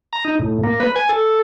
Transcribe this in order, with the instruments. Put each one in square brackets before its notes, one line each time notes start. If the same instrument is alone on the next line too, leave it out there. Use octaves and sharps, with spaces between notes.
[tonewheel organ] A#5
D#4
A2
A#3
B4
G#5
A4